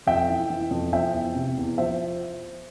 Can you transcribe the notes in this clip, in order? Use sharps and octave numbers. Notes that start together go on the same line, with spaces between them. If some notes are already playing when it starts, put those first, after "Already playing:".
F2 E5 G5
E3
E3
F2
F3 E5 G5
E2
C3
E2
F3 C5 E5